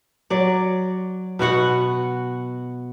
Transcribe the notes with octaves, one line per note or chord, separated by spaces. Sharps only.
F#3 D5
B2 B3 F#4 F#5